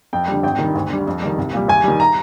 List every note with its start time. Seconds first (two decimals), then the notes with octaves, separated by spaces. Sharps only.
0.13 F2 G5
0.28 D3 G3
0.43 G#1 G5
0.59 G2 D#3
0.75 D2
0.90 D3 G3
1.07 F2
1.22 D#3 G3
1.38 C2
1.53 A#2 G3
1.68 D#2 G#5
1.84 D#3 G3
2.00 A#5